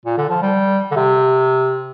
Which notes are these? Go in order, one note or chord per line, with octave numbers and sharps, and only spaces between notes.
A#2
D3
F3
G3
D3
C3